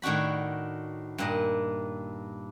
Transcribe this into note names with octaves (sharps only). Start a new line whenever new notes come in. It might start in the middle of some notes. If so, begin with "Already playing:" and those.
A2 D#3 D4 F#4 B5
G2 A#2 D#5